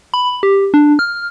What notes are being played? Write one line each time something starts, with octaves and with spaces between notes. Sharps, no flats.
B5
G4
D4
F6